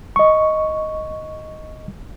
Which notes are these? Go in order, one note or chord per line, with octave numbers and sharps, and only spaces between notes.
D#5 C#6